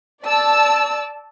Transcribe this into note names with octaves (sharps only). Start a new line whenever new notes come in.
D5 A5 E6